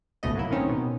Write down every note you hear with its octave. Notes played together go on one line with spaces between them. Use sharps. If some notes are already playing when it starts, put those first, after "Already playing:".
G1 C#2 G#2 B2 A3 D#5
F#3 A#3 E4
A2 D#3 C4 C#4 D#4
B2